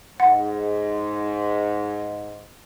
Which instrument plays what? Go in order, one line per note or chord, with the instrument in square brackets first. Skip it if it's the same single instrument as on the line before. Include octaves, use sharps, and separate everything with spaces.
[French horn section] G#2 [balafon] F#5